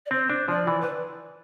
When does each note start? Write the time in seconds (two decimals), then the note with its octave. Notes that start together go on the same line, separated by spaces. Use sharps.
0.06 D5
0.11 C4 C5
0.30 D4
0.48 F3 D5
0.67 E3
0.81 B4